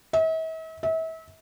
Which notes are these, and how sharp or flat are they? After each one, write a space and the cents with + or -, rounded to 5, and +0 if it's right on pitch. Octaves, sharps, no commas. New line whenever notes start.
E5 -45
E5 -35